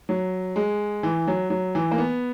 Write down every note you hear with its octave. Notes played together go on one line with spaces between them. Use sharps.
F#3
G#3
E3
F#3
F#3
E3
A#3
B3